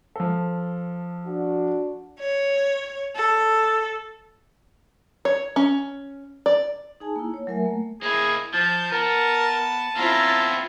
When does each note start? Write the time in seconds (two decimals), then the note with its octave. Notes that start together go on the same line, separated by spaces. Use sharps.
0.16 F3 A4
1.27 D4 F#4
2.20 C#5
3.16 A4
5.25 C#5
5.56 C#4
6.46 D5
7.00 D#4 G#4 G#5 A5
7.16 A#3 E4
7.34 C#5
7.47 F#3 A3 A#4 E5 G#5
7.65 A3 A#3
8.03 A#3 E4 G#4
8.54 F3 A5 G6
8.92 B3 A#4 A5
9.97 B3 C4 E4 F4 A#5